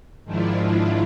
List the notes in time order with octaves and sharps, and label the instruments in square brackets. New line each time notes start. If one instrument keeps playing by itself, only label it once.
[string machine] G#2 D#3 F3 D4 E4 F4